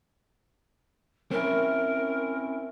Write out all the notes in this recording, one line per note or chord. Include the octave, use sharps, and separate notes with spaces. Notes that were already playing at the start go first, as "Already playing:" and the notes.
C4 C#4 E4 A#4